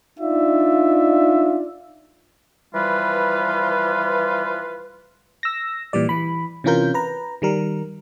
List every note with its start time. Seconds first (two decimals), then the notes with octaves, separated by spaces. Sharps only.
0.20 D4 D#4 F4 D5 E5
2.74 E3 F3 G3 F4 B4
5.43 E6 A#6
5.93 A#2 E3 G3 D5
6.09 E3 B5
6.64 C3 E3 C#4 F4 A#4 G6
6.94 B4 A#5
7.42 D#3 G3 A#4